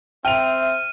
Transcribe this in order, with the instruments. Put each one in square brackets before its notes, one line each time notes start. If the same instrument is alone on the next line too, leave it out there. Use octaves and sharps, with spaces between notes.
[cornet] C4 [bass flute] E5 [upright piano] G5 F7 [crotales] F6 D#7